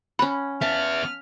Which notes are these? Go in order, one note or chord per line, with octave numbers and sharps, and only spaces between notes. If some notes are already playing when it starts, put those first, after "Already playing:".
C#4 F#5 B5
B3 E5 F5 A5 F6